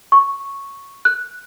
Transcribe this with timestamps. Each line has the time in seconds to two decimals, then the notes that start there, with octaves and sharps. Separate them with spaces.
0.12 C#6
1.05 F#6